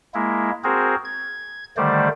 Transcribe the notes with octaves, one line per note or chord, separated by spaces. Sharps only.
G#3 A#3 E4
C4 F#4 G#4 A#4 C5
G#6
D3 D#3 G3 A3 C5 D5